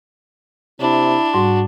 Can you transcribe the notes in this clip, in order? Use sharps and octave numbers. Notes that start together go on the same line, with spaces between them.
C3 D4 E4
G#2 G3 F#4 C6